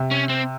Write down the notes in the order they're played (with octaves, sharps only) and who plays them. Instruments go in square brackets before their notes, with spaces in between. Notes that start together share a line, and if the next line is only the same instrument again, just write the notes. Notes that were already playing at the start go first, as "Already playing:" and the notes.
Already playing: [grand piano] C3
[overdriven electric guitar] C#4
C4